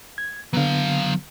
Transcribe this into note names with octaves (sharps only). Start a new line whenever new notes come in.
G#6
D3 F#3 B3 F5